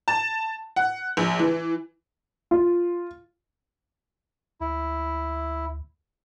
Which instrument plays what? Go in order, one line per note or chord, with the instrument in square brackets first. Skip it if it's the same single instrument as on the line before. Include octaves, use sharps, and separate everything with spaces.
[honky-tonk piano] A5
F#5
A#1
E3
[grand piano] F4
[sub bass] D2 [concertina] E4